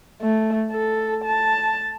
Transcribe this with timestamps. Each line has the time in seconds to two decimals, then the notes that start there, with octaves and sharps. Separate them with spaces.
0.22 A3
0.71 A4
1.24 A5